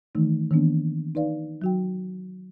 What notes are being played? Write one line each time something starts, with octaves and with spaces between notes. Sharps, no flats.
D#3 E3 A3 D#4
D#3 E3 A#3 B3 D4
D#4 B4 D5 F5
F#3 F#4 G5